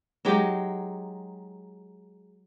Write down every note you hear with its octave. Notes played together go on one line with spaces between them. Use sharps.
F#3 G#3 D#4 G4